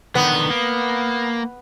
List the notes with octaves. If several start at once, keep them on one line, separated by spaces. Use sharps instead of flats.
D3 D#3 B3
A#3